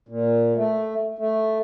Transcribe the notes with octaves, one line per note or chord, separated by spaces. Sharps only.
A#2
A3
A3